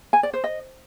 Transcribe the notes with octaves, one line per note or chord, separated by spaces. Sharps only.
G#5
D5
C5
D#5